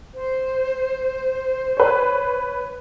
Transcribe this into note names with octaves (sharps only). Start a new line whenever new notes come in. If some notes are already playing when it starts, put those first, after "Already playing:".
C5
B4 C#5